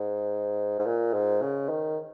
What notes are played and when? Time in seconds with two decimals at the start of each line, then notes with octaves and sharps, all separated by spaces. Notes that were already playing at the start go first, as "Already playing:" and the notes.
Already playing: G#2
0.79 G#2
0.86 A#2
1.13 G#2
1.42 C#3
1.69 D#3